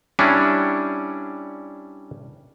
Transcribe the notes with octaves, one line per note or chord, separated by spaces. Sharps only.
G3 C#4 D4 E4